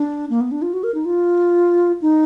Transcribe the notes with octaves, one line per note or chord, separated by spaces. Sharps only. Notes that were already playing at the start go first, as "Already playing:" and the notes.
Already playing: D4
A#3
B3
D4
F4
F#4
A#4
D#4
F4
D#4